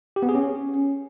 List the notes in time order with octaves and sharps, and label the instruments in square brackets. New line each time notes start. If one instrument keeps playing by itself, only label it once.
[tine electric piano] G4
B3
G#4
C#4